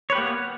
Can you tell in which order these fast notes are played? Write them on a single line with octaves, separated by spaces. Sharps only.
C#5 B4 G4 A#3 B3